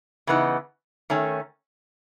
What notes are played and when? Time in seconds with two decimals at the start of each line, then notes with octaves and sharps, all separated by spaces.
0.27 C#3 E3 B3 D#4
1.10 D#3 A3 C#4